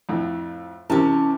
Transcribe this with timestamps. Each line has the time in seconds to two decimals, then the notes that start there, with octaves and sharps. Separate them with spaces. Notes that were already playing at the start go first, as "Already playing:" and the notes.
0.09 F2 A2
0.90 C3 E3 C#4 A#4 A5